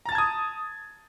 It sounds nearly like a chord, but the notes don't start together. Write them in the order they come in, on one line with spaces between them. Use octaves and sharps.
A#5 A6 A5 G#6 D#6